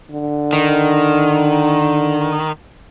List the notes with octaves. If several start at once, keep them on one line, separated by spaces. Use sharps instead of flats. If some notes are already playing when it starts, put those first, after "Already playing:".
D3
D#3